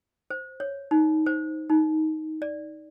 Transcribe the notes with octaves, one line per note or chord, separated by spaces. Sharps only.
C5
C#5
D#4
C5
D#4
D5